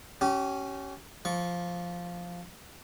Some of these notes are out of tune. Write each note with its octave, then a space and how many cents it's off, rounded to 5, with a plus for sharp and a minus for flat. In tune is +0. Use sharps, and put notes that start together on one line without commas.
C#4 +0 G4 -35
F3 +0 C#6 +30